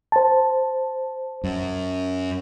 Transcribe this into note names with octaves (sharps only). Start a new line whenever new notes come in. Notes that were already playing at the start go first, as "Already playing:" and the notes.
C5 A5
F#2